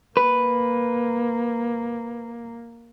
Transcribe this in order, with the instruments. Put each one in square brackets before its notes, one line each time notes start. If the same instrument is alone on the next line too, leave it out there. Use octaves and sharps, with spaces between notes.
[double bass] A#3 [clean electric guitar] B4